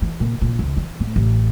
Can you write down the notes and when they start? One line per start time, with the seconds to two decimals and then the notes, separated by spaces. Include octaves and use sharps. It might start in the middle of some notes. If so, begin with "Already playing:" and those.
0.02 E3
0.20 A#2
0.41 A#2
0.59 C#2
0.77 E3
1.00 A2
1.16 A1